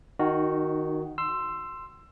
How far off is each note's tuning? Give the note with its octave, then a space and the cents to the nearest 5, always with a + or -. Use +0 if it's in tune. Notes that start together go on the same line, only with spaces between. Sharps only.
D#3 +0 D#4 -35 F#4 +0
C6 +0 E6 +20